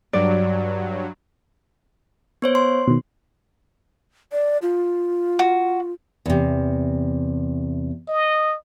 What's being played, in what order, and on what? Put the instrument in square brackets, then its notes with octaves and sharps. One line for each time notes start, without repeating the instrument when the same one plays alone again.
[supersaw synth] G2 F#3 [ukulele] D5
[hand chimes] B3 C5 C#5
C6
[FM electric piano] B2 D#3
[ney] D5
F4
[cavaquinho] F#4
[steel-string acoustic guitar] E2 C3
[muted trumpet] D#5